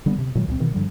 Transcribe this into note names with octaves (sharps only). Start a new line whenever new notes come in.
D3 G3 A#3 B3
C3
A#2 D#3 F#3 G#3
C#2 A#2 C4
B2 D#3 E3
G2 D3 F3 G3